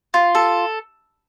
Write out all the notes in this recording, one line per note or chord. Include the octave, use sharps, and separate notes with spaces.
F4
A4